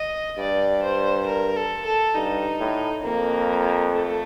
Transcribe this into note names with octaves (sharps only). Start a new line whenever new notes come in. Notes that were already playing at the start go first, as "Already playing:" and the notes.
Already playing: D#5
G2 D5
C5
A#4
A4
A4
G2 D#4
A2
F2 A#3
A3